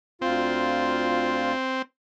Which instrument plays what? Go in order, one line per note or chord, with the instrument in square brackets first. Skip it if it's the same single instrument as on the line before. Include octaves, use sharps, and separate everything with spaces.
[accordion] D2 F4 [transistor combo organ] C4